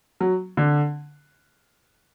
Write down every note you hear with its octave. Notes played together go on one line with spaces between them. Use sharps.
F#3
D3